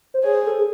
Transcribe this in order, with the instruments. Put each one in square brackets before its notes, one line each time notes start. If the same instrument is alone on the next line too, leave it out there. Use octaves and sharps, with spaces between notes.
[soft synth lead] C5
[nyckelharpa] G#4 [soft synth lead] C#5
[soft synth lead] C5
A4
G#4